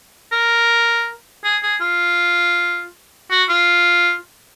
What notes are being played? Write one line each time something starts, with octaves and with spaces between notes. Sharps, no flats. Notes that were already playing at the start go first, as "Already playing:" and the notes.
A#4
G#4
G#4
F4
F#4
F4